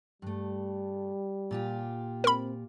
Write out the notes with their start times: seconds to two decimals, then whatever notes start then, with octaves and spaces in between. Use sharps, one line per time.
0.22 G2 G3 A3
1.51 A#2 F4 G4
2.24 C4 A#4 B5